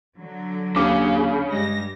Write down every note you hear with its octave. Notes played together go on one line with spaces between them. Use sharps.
D3 F#3
D#2 C#3 D4 D6
G2 G3 G#3 A#6